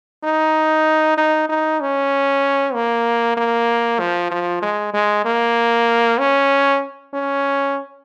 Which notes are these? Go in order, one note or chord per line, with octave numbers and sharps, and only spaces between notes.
D#4
D#4
D#4
C#4
A#3
A#3
F3
F3
G#3
G#3
A#3
C#4
C#4